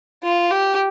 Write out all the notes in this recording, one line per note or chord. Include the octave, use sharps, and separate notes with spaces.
F4
G4